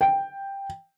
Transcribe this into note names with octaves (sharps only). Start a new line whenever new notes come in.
G5